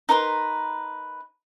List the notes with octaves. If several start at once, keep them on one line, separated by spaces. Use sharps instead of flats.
D#4 A#4 B4 C6